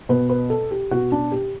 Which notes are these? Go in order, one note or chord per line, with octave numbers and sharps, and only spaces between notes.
B2 B4
B4
A4
G4
B2 F#4
D4
G4